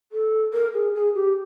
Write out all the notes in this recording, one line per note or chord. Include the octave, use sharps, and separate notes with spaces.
A4
A#4
G#4
G#4
G4